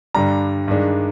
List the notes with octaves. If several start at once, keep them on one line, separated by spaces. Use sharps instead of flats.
G2 D3 G3 D4 A#5
G2 D#3 G#3 D4